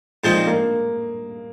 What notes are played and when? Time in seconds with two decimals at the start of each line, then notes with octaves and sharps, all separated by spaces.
0.24 A#2 F3 G#3 C4 D#4
0.47 A#3